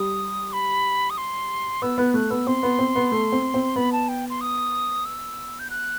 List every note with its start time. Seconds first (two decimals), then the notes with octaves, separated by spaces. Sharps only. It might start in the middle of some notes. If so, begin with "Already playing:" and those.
Already playing: G3 D#6
0.53 B5
1.10 D#6
1.17 C6
1.82 B3 E6
1.98 B3 F#6
2.14 A3 F#6
2.30 B3 E6
2.47 C4 C6
2.63 B3
2.79 C4
2.95 B3
3.12 A3
3.32 C4
3.54 C4
3.76 B3 B5
3.92 A5
4.08 G5
4.30 C6
4.41 D#6
5.05 E6
5.59 G6
5.70 F#6